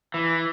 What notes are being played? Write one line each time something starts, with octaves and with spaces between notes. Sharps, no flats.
E3